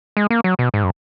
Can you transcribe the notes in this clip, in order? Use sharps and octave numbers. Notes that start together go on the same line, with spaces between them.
G#3
A#3
F#3
B2
G#2
F#2